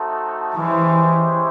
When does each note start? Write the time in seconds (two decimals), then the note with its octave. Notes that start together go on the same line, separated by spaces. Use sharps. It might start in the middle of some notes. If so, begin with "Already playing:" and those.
Already playing: A3 C4 D#4 F#4 A4
0.56 E3 G#3 C#4 E4 G4 C5